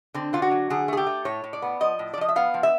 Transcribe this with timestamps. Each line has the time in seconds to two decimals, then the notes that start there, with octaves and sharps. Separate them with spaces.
0.14 D3 C4
0.33 D3 F4
0.42 F#4
0.51 F#3
0.70 D3 G#4
0.88 A3 G#4
0.97 G4
1.07 A3
1.25 A2 C#5
1.44 A2
1.53 D5
1.62 B3
1.80 F3 D#5
1.99 A2
2.14 D5
2.18 F3 D#5
2.29 E5
2.36 B3 F5
2.54 F3
2.63 E5